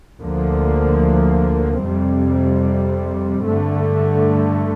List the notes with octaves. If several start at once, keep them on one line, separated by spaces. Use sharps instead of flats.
D2 D3 F3 A#3
F2 C3 G3 C4
G2 D3 A3